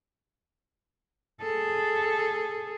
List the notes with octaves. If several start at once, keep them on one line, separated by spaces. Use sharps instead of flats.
G#4 A4